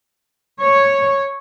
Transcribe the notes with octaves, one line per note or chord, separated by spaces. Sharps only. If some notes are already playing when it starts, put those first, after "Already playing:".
C#5